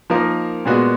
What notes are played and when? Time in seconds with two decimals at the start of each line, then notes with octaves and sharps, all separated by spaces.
0.10 F3 A#3 D#4 A#4
0.65 A#2 G#3 B3 F#4